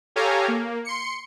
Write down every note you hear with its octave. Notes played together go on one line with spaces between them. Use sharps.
G4 A4 C#5 F5 G#5 A#5
A#3
C6 C#7